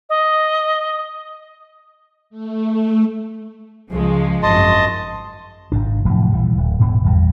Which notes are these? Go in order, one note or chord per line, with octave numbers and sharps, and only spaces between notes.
D#5
A3
C#2 F3 G#3
G#1 F#2 D#5 A5 C6
G#1 G#2 D4
F1 A2 F3 F#3
A#1 E3 G3
D1
D#1 G#2 B2 D3
G#1 E2 G2 G3